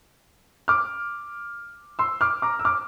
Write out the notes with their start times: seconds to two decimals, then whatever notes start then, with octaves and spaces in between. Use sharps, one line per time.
0.68 D6 F6
1.99 C6 E6
2.21 D6 F6
2.42 A#5 D6
2.59 E6
2.65 D6 F6